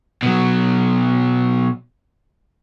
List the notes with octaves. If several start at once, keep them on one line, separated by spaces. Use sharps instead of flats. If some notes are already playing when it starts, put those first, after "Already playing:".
B2 F#3